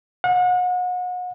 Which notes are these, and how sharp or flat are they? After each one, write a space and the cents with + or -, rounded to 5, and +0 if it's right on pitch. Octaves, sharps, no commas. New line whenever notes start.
F#5 -35